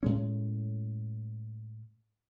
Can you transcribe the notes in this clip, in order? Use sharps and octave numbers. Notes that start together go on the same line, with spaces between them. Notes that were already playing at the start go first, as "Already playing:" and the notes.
A2 G#3 C#4